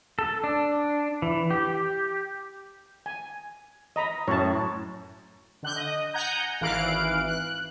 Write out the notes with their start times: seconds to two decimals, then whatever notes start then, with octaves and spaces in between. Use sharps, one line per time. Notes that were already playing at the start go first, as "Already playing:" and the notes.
0.19 A4
0.44 D4
1.22 E3
1.51 G4
3.06 G#5
3.96 D#5 A#5 B5
4.28 F#2 A2 C#5 A5
5.63 D3 F#6 G6
5.76 D#5
6.14 F#5 G#5 A#5 G6
6.61 G#1 E3 F5 F#6 D7
7.27 F#6